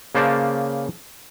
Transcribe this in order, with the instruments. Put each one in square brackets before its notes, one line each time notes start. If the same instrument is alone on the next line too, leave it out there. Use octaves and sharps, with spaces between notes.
[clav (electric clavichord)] C#3 A#3 C5 D5 A5